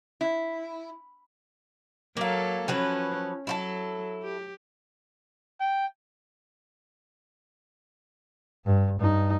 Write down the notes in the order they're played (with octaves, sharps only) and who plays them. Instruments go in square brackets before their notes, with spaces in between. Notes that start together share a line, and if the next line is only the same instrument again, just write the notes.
[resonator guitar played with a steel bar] E4
[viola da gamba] F#3 A4 [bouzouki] A#3 F5
[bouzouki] F3 F#3 B4 [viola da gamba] C#4
[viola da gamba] F#3 [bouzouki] E4 F4 A4
[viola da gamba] G4
[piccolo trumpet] G5
[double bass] G2
G2 D#4